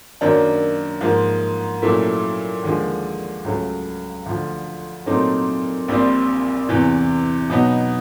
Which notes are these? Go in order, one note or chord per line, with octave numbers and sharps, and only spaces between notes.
F#2 D#3 F#3 A#3 D4
G#2 F3 A#3
A#2 F#3 A3 C#4 E4
D#2 D3 F3 G#3
C#2 C#3 F#3 A3 C#4
D2 D3 F3
A#2 F#3 A3 C4 D#4
A#1 A#2 G3 C4
E2 C3 E3
B2 F#3 B3 D#4